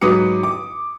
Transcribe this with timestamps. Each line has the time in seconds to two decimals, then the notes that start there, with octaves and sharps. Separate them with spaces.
0.01 G#2 F#3 B4 D6 D#6 C#7
0.43 D6